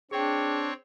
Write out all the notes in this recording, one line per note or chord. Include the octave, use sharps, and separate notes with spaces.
C4 D4 G#4 C#5 G5